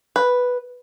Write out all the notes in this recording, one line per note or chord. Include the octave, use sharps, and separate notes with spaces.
B4